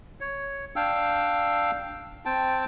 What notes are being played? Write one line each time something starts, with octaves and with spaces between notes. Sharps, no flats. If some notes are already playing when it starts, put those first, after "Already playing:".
C#5
D4 F5 G5 E6
C4 G5 A5